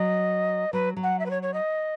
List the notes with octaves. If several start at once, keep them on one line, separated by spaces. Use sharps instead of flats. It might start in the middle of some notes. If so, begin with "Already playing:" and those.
Already playing: F#3 D#5
F#3 B4
F#3
F#5
E5
B4
C#5
C#5
D#5